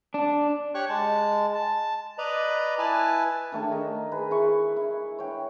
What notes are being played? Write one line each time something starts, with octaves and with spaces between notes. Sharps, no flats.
D4
G4 C#5 C#6 F#6
G#3 A5
A5
B4 D5 D#5 A#5 B5
E4 B4 G#5 A5
D#3 A3 D4
A#4 D#5
G#4 B4
E4 C#6
E4
C#5 G5